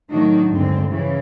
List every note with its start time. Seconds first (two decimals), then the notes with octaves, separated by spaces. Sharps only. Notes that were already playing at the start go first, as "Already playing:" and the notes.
0.11 A2 D#3 F#3 D4 D#4 F#4
0.49 D2 G2 D3 G#3 C4
0.89 C#3 E3